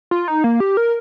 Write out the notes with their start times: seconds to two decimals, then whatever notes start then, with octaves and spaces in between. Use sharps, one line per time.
0.11 F4
0.28 D#4
0.44 A#3
0.60 G4
0.77 A#4